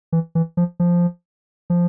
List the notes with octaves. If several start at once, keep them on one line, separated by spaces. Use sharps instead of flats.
E3
E3
F3
F3
F3